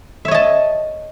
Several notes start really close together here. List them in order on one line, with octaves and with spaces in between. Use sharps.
E5 C#5 D#5 A5